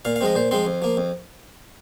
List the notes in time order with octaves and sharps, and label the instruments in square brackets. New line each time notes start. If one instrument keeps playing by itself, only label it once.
[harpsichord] A#2 F5
F5
F3 G#3 C4 D#5
A#2 C5
F3 G#3 C4 C6
F2
F3 A#3
F2